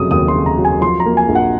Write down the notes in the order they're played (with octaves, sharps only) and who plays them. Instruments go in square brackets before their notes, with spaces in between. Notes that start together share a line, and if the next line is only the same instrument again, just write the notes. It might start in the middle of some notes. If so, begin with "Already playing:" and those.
Already playing: [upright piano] F1 C#3 F#3 D#6
D#2 D#6
C6
C#3
A#5
F#3
G#5
F3 C6
A#5
A#3
G#5
A#1
F#5